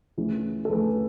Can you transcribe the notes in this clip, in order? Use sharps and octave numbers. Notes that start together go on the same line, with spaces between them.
D2 C#3 E3
A4
D2 C#3 E3 G#4 B4